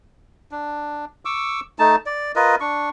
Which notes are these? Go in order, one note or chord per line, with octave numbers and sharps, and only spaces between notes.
D4
C#6 D6 E6
A3 D#4 A5
D5
F4 A#4 B4 D#5
D4 C#6